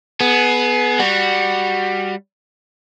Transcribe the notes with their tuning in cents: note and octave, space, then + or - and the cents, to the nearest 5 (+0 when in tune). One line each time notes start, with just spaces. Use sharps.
B3 +0 G#4 +30
G3 +10 F#4 +0